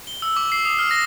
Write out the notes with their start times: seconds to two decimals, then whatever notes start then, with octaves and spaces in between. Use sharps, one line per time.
0.07 G7
0.22 E6
0.36 D6
0.52 C7
0.65 D#6
0.79 F6
0.91 A#6